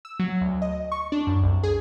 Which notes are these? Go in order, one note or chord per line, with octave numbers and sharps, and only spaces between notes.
E6
F#3
D2
D#5
C#6
D4
F#2
C2
G#4